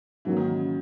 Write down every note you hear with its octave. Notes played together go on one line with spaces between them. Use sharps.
G#2 E3 F#3 A#3
D#3
C#3
C#3